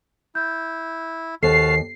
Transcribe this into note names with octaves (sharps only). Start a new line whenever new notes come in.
E4 G6
D#2 F#4 A4 C5 A5 F6 C7